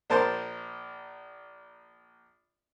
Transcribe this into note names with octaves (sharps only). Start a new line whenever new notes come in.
A#1 A#4 C5 A5 C6